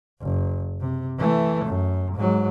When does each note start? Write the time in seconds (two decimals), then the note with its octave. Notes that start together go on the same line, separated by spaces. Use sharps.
0.21 F#1
0.80 C3
1.18 E3 A3
1.65 F#2
2.16 G#2 F#3